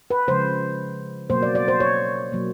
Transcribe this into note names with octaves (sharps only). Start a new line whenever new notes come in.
B4
C#3 F3 G#3 C5
B2 F#3 A#3 C5
D5
D5
C5
C#5
B2 F#3 A#3